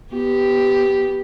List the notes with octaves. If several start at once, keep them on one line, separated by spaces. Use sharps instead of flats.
B3 G4